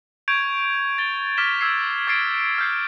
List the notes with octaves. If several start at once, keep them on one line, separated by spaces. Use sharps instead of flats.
C#6 G6 G#6 D7 F7
A6 G7
D6 F6 B6 E7 G7
E6 G#6 C7
D6 G#6 A6 C7 D7
F6 G6 C7